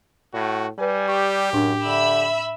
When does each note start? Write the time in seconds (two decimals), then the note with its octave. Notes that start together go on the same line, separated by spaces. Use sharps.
0.34 A2 F#4
0.78 G3 G4 B4 G#5
1.08 G4 C#6
1.53 F#2 A2 D4 A#4
1.85 D3 E5 B5 E6